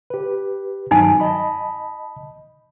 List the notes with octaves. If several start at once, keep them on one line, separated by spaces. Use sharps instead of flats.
G4 B4
G2 D#3 F#3 D#4 G#5
D#5 A5 B5